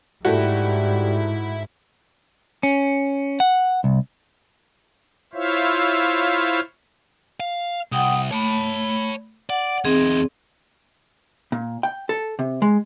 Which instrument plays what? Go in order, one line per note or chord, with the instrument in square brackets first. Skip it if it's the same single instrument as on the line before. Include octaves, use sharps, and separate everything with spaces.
[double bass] G#2 [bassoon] G3 [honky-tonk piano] A3 F#4 [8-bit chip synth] E4
[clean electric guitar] C#4
F#5
C2
[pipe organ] E4 F4 C5 C#5 E5 F5
[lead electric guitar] F5
[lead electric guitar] C2 [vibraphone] F#5 G5 D#6
[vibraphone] A3 B5 [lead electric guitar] C#5 A5
[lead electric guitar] D5 [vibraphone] F#5
[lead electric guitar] E2 D#4 [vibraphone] C4 G#4
[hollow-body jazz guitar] A#2
G5
A4
C3
G#3